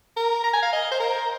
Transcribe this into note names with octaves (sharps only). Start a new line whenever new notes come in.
A#4
A#5
G#5
F5
D#5
C5
A#4